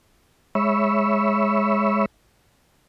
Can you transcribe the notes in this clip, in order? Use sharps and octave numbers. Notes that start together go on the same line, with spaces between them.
G#3 C#5 E5 B5 C#6 E6